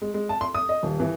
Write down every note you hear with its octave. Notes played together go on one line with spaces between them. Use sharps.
G#3
G#3
A5
C6
D#6
D#5
D#1
E3